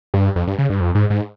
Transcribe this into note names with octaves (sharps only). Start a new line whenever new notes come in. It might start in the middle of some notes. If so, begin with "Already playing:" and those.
G2
F2
G2
C#3
G2
F2
G#2
G#2